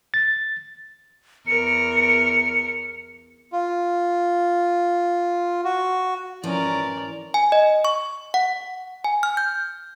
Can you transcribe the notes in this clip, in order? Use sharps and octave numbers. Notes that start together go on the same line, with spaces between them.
A6
E2 A#4 C#7
F4
F#4
G#2 E3 F3 C#4 A#4 D5
G#5
D#5
C#6
F#5
G#5
F6
G6